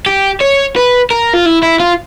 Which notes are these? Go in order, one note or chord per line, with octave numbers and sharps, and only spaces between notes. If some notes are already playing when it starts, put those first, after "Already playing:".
G4
C#5
B4
A#4
F4
E4
E4
F4